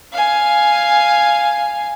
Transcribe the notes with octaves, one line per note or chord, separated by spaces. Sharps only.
F5 G#5